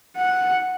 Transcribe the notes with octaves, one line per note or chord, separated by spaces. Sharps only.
F#5